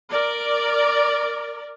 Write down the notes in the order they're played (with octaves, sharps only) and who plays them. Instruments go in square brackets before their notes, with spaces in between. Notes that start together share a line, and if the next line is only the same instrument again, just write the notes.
[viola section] A#4 D5